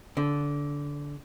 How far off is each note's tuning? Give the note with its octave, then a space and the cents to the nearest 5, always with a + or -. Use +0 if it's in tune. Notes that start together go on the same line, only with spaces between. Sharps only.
D3 -20